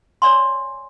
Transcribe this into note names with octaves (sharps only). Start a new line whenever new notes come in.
C#5 D5 G#5 C6